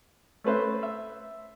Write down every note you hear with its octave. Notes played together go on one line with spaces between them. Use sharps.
A3 C#4 B4 C5 E5
E5